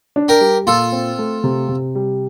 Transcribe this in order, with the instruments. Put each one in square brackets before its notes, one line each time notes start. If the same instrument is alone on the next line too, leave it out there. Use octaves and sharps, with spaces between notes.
[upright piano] D4
[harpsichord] G4 A#4
[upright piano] G3
[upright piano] A#2 [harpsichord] F4 A4
[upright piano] C4
A3
C3
C3
G3